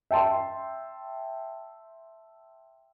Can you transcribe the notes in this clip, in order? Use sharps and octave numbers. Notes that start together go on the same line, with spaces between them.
E5 G5 A5 C6